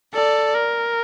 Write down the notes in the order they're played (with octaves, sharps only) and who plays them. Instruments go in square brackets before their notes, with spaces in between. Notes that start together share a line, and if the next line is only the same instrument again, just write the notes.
[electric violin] A4 [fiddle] D5
[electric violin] A#4